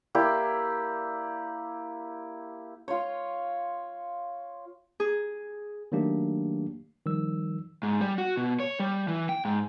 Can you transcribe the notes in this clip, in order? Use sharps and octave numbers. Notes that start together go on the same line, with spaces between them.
A#3 E4 G4 D5
F4 C#5
G#4
D#3 F#3 A3 A#3 D4 G4
D#3 F3 G3 E6
G#2
G3
F#4
B2
C#5
G3
E3
G5
G#2